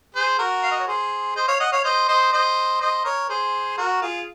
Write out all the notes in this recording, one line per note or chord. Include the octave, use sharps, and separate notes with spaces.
G#4 C5
F#4 A#4
F5
D#5
C#5
G#4 C5
C5 D#5
C#5 F5
D#5 F#5
C#5 F5
C5 D#5
C5 D#5
C5 D#5
C5 D#5
A#4 C#5
G#4 C5
F#4 A#4
F4 G#4